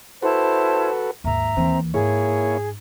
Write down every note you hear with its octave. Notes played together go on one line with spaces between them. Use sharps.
E4 F#4 A4 B4 C5 A5
D#2 G#2 E5 A#5
D#2 E3 C4
G#2 A#3 E4 G#4 C#5